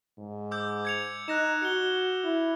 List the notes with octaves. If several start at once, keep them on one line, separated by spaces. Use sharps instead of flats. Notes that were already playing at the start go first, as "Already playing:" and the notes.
G#2
D6 E6 G6
G#6 C#7 F7
D#4 F#6 A#6 E7
F#4 C#7 G7
E4